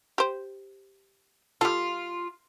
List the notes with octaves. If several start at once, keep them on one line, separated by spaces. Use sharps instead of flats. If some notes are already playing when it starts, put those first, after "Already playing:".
G4 C5
G3 F4 A4